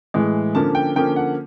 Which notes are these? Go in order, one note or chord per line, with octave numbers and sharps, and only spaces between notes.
A2 E3 G#3
D3 F3 A#3 C#4 A5
G5
D3 F3 A#3 C#4 G5
F#5